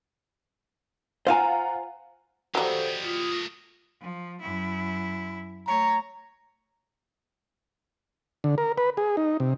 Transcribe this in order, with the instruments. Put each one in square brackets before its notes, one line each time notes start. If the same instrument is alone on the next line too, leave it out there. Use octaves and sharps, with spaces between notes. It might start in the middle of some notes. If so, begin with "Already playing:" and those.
[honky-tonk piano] F4 F#5 A#5 [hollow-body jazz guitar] C5 F5 G#5
[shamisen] F#3 G3 [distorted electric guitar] G4 D#5 [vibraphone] A4 C5 F5
[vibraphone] F4 D#6
[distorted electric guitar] A3 A#4
[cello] F3
F#2 E4
[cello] A3 C#5 [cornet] A#5
[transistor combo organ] D3
A#4
B4
G#4
D#4
C3